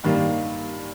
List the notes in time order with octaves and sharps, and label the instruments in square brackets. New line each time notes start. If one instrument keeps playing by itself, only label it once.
[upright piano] G2 D#3 G3 A#3